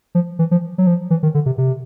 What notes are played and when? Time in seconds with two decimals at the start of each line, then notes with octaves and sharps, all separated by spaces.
0.15 F3
0.39 E3
0.51 F3
0.78 F#3
0.87 F3
1.10 E3
1.23 D#3
1.34 D3
1.46 C3
1.58 C3